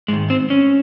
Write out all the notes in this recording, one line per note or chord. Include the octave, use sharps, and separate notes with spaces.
G#2 D#3 G#3
C4
C#4